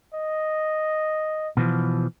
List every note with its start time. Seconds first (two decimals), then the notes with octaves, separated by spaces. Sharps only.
0.14 D#5
1.57 B2 E3 F3